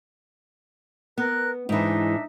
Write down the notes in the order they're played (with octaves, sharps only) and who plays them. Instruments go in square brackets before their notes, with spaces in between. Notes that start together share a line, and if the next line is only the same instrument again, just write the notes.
[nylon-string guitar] B3 [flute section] A#4 F#6
[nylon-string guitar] G#2 E3 [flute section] D4 D#4 E5